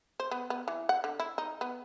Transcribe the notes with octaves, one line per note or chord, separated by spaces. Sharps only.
C5
B3
B3
E3
F#5
D3
E4
D#4
B3